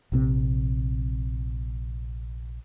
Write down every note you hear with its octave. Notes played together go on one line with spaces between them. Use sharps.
A#1 C3 C4